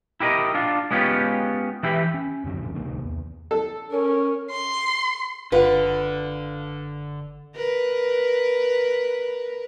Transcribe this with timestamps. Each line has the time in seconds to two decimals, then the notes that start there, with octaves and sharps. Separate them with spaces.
0.20 E4 G4 A#4 D#5
0.55 D4 F4
0.91 G#3 B3 C#4 F4 G4
1.83 E3 E4 G4
2.14 C#4
2.44 F#2 D3 D#3 F#3
2.61 E1 A1 F2 D3
2.74 D1 C2 D#3 A#3
3.04 E2
3.51 A4
3.91 C#4 A#4
4.51 C6
5.52 F#1 D3 F4 B4 F#5
7.56 A#4 B4